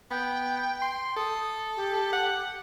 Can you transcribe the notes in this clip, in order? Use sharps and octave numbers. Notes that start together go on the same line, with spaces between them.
B3 G5
C6
A4 D#6
G4
F#5